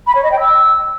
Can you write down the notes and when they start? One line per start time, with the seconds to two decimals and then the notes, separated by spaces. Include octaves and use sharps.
0.07 B5
0.15 C#5
0.23 D#5
0.31 G5
0.40 E6